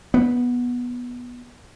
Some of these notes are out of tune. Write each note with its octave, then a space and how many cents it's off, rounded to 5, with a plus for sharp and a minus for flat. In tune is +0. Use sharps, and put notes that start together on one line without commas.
B3 -10